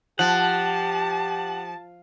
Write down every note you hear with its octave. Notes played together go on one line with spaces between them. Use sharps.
F3 G4 F#5 A5